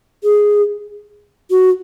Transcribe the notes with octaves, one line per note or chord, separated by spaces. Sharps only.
G#4
F#4